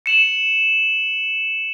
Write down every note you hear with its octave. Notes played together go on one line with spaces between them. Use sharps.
C#7 E7 F#7